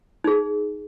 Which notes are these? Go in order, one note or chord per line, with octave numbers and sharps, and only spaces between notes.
D#4 G#4